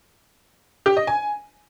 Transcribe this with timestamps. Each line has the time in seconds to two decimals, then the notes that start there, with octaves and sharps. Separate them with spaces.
0.86 G4
0.97 D#5
1.07 G#5